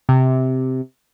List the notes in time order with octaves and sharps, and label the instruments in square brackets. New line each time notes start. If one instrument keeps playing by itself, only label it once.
[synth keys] C3